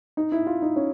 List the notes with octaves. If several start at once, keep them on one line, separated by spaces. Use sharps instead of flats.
D#4
E4
F4
D#4
C#4